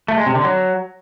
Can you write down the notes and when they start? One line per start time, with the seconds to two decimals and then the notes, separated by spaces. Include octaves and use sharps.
0.08 A3
0.17 G#3
0.26 C3
0.35 D3
0.44 F#3